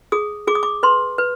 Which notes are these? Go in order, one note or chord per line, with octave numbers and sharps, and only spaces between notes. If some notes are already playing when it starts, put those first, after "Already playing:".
G#4 D#6
G#4 D6
D#6
D6
B4 C6
B4